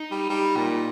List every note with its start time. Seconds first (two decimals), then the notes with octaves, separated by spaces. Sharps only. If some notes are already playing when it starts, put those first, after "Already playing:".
Already playing: D#4
0.12 G3
0.30 G3
0.57 A#2